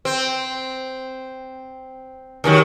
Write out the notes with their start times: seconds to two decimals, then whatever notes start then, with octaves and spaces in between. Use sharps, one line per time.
0.05 C4
2.44 D#2 D#3 F#3